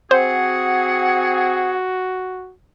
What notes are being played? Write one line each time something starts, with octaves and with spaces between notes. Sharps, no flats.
C4 F#4 G#4 C5 F#5